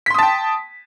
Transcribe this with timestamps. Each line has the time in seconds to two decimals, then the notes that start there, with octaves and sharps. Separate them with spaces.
0.06 B6
0.10 C6
0.14 D#6
0.19 A5
0.23 G5